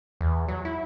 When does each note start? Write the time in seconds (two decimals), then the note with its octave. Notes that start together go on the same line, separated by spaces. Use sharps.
0.21 E2
0.48 F#3
0.65 E4